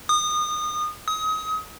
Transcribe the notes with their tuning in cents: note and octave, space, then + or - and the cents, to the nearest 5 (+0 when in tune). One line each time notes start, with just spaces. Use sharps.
D#6 -30
D#6 +30